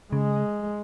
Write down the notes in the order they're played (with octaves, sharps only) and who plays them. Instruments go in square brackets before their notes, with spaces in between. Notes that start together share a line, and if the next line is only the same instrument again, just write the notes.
[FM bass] C#3 [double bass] G#3